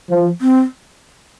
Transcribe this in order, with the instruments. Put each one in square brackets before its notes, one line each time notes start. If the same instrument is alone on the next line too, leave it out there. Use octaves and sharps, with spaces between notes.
[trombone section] F3
[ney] C4